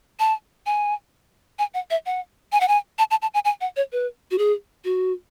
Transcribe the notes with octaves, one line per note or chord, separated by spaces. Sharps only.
A5
G#5
G#5
F#5
E5
F#5
G#5
F#5
G#5
A5
A5
A5
G#5
G#5
F#5
C#5
B4
F#4
G#4
F#4